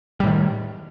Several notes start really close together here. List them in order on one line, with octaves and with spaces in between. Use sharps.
G3 A2 D#3